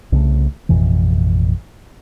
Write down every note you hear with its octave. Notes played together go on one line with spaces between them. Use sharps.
C2 C#3 G#3 A3
A1 F2 B2 E3